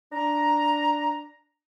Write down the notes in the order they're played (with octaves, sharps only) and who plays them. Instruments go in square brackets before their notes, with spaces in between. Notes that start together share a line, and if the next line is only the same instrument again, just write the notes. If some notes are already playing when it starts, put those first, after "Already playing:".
[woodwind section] D4 A#5